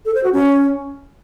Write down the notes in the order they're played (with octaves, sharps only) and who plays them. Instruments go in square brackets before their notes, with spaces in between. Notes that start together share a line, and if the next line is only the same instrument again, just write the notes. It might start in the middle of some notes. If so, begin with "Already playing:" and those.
[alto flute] A4
C5
F#4
C#4